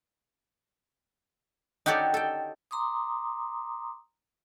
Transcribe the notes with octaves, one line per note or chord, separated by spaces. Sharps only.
D#4 F#4 G4 A4 C#5 D5
A4 G5
A#5 C6 D6 D#6